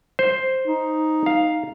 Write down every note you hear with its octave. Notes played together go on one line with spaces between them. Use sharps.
C5
D#4
F5